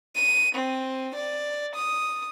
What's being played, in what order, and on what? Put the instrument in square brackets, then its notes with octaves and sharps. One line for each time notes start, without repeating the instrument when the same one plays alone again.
[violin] D#7
C4
D5
D#6